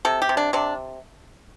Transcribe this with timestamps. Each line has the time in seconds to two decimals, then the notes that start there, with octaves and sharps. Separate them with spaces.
0.05 C3 A4
0.22 G4
0.29 C3
0.37 D4
0.53 C3 D4